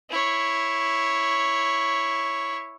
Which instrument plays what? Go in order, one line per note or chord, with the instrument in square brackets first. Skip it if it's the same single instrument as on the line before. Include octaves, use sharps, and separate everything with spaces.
[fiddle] E4 C#5